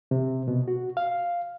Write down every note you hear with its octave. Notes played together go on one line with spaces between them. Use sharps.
C3
B2
F#4
F5